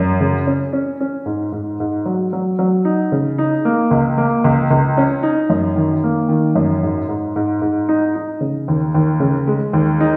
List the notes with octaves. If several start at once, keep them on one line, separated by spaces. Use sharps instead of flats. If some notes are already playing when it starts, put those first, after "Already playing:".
Already playing: F#2
C#3
C#4
C#4
C#4
G#2
G#2
G#2
F#3
F#3
F#3
D#4
C#3
D#4
A#3
C#2
A#3
C#2
C#2
C#4
D#4
F#2
D#3
A#3
D#3
F#2
G#2
G#2
G#2
G#2
D#4
D#4
C#3
D#2
D#2
C#3
G#3
D#2
D#4